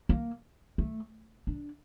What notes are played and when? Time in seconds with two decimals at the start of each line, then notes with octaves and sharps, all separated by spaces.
0.09 A#3
0.78 A3
1.47 D4